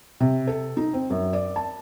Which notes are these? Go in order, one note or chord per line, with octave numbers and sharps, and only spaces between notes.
C3
A4
D#4
C4
F#2
D5
A5